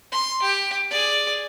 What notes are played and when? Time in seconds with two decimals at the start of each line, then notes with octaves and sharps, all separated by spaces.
0.12 C6
0.43 G4
0.91 G#4 D5